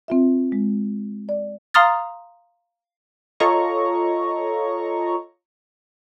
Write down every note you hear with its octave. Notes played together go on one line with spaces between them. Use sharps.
C4 F4 E5
G#3
D5
F5 A#5 C6 D#6 F6 A6
F4 A4 C#5 D#5 A#5 C#6